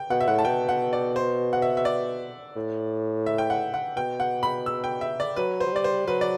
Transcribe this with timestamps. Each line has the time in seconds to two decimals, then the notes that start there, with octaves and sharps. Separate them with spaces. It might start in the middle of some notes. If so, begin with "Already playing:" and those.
Already playing: G5
0.10 B2 F#5
0.21 E5
0.28 A2 F#5
0.39 A5
0.45 B2 G5
0.69 F#5
0.93 D5
1.16 C5
1.53 F#5
1.62 E5
1.77 E5
1.85 D5
2.56 A2
3.26 E5
3.38 G5
3.50 F#5
3.74 F#5
3.97 B2 G5
4.20 F#5
4.43 B5
4.66 E6
4.84 G5
5.01 E5
5.20 D5
5.36 F#3 B4
5.60 C5
5.66 F#3
5.72 G3 D5
5.84 C5
6.07 F#3 B4
6.21 D5